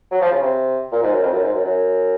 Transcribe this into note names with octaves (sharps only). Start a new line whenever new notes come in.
F#3
F3
C#3
C3
A#2
G#2
F#2
F2
F#2
G#2
F#2
F#2